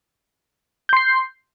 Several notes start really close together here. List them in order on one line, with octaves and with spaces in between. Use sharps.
G6 C6 C7